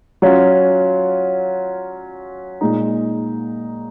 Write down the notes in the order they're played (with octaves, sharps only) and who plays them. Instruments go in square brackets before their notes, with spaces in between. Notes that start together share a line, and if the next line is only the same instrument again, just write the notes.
[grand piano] F#3 C#4 F4
A#2 G#3 D#4